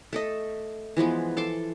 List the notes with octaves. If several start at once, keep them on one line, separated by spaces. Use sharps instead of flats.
A3 A4 D#5
E3 F3 G#3 B3
A4 A5 C6 D6